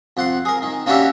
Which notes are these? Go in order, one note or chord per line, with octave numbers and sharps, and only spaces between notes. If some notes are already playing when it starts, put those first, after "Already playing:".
F2 F#5 C6
G#4 A#4
D#3
A#3 C#4 D4 F#4 G4 E5